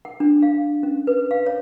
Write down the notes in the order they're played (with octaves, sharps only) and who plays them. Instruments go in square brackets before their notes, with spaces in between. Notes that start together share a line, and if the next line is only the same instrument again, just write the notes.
[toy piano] F#5
D4
F5
C#4
B4
F5
C#5